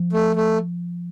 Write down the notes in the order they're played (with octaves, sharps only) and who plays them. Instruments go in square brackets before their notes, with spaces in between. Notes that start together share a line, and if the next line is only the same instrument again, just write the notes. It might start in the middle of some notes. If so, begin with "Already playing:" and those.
Already playing: [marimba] F3
[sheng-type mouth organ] A3
A3